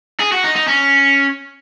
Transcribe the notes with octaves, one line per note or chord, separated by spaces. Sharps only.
G#4
F#4
D#4
D#4
C#4